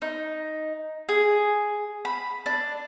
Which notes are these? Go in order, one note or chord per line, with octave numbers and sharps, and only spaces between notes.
D#4
G#4
B5
D4